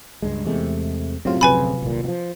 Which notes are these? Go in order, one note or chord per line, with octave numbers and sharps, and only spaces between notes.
C#2 G2 G#3
E2 C3 G#3 A3
F#2 A2 C3 F#3 F4
D1 F2 C#3 B4 G#5 B5
D#1 C2 A#2
B2 F3